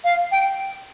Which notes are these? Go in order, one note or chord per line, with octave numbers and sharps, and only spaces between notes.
F5
G5